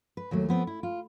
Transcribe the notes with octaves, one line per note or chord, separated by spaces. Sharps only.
B4
D#2 F#3 A3
F3 B3 C4
E4
F4